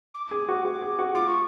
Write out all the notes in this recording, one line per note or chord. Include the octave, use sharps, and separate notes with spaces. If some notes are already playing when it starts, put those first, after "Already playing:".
D6
G#4
F#4
F#4
G#4
F#4
F4 D6
C#6